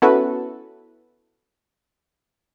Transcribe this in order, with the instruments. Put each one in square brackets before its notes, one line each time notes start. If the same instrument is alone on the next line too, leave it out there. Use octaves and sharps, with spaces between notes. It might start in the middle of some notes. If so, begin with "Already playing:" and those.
[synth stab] B3 C#4 E4 F#4 A4 B4